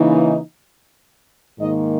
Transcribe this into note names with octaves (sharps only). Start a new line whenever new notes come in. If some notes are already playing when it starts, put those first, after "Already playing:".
Already playing: C#3 E3 A#3 D#4
G#2 D#3 A#3 D#5